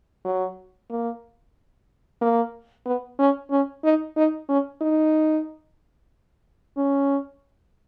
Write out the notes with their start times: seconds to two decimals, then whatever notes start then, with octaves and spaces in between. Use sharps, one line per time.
0.25 F#3
0.90 A#3
2.22 A#3
2.85 B3
3.19 C#4
3.51 C#4
3.84 D#4
4.17 D#4
4.49 C#4
4.81 D#4
6.77 C#4